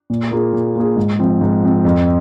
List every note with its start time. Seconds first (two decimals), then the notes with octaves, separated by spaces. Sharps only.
0.10 A#2
0.31 A#3 F4 G#4
0.53 A#2
0.75 A#3 F4 G#4
0.96 G#2
1.19 F3 C4
1.41 G#2
1.63 F3 C4
1.85 F2